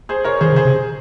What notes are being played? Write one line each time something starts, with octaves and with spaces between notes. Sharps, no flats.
G#4 C5
A#4 C#5
D#3 G#4 C5
C#3
G#4 C5
C3